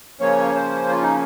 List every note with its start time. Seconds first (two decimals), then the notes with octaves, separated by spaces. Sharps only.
0.20 C#3 F3 A#3 C#4 C#5
0.55 C5
0.89 F4
1.02 D#4